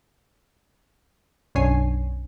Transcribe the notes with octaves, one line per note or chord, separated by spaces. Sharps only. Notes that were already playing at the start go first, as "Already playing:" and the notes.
B1 F#2 D4 C#5 G#5 C7